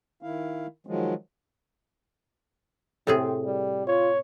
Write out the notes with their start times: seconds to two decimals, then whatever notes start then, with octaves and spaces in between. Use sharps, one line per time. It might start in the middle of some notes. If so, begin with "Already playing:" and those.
0.22 D#3 E4 F5
0.87 D#3 F3 F#3 G#3
3.07 A2 C3 C4 G#4
3.45 G3
3.87 F4 C#5